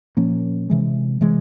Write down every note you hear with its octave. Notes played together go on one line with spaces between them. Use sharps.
A#2 F3 A#3 C#4
C3 E3 G#3
C3 E3 G#3